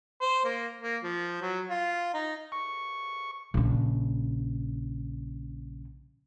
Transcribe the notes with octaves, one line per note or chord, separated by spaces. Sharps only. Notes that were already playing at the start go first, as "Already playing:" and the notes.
C5
A#3
A#3
F3
F#3
F4
D#4
C#6
A#1 C#3